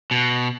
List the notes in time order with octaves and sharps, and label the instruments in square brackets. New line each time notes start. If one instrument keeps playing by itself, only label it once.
[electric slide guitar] B2